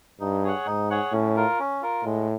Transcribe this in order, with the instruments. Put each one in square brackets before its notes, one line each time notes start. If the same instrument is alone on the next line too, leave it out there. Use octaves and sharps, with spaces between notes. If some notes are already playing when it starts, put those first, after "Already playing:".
[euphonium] G2 [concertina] D#4
[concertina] G#4 C#5 F#5
[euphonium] G#2 [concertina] D#4
[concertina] G#4 C#5 F#5
[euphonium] A2 [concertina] C#4
[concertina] F4 A#4
C#4
F4 A#4
[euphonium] A2 [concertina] G#3